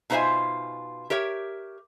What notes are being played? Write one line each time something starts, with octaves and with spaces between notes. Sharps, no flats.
B2 D#4 F4 C5 E5 G#5
G4 A#4 C#5 E5